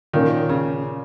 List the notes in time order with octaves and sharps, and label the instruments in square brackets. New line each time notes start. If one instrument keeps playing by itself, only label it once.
[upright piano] A#2 A#3 C#4 [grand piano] D#3
[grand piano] C#3